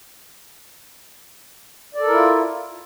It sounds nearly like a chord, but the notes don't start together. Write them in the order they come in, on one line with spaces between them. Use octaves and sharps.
D5 A4 A#4 E4 F4